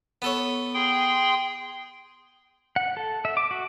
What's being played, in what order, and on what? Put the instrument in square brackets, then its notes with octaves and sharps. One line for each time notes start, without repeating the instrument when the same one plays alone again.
[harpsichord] B3 A4 C#5
[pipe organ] G#4 G5 C6
[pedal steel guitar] F#5
A4
E5
D6
F#4